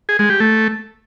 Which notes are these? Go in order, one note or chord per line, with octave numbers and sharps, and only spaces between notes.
G#4
G#3
G4
A3